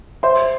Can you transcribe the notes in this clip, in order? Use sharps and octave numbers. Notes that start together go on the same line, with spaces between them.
C5 E5 C6